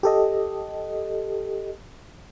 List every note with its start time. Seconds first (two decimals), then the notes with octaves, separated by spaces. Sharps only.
0.03 G4 A4 D#5